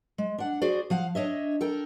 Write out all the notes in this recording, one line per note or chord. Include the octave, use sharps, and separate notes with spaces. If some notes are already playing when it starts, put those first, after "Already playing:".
G#3
D4 F#5
F#4 G#4 C5 D5
F3 F5 F#5
D4 C#5 D#5 E5
A4 A#4 G5